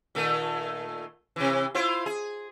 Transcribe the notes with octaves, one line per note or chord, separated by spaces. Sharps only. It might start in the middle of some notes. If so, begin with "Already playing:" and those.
A#2 D#3 A3
C3 E3
E4 F4 C5
G#4